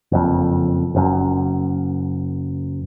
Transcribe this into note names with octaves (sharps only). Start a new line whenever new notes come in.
F#1 F2
F#1 F#2